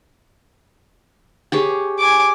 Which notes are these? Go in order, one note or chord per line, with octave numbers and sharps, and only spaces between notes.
G4 G#4 C#5
G#5 D6